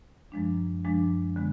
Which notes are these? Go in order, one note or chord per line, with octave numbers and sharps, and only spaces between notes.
F#2 F3 G#3 D4
F#2 F3 G#3 D4
D3 G#3 B3